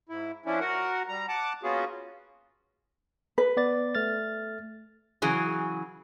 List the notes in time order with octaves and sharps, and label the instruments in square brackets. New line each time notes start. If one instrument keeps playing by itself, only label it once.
[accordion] G#2 E4
F3 C#4 D4 E4
F#4 A#4 F#5
G3 A#5
F#5 A5 D6
A#3 B3 C#4 F4 F#4 G#4
[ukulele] B4
[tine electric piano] B3 D5 A6
A3 F6 A6
[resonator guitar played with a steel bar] C#3 E3 F#3 G#4